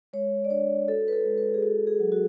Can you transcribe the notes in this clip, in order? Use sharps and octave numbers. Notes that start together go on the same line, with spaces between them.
G#3 C#5
D5
D4 C#5
F#4 A4
B4
A4
G#3
B4
G#4
F#4 A4
G#4
F#3
F#4